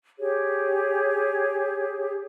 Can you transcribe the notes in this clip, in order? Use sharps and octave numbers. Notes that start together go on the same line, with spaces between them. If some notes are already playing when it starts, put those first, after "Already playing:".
G4 G#4 C#5